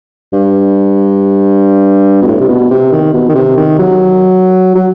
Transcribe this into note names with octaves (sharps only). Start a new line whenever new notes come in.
G2
B2
A2
C3
B2
C3
D#3
B2
D#3
C3
D#3
F#3
F#3